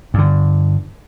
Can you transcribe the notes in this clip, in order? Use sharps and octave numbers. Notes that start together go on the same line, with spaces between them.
G2 D3